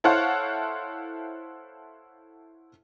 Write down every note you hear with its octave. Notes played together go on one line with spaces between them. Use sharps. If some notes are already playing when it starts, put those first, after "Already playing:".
E4 A4 C5 C#5 F5 F#5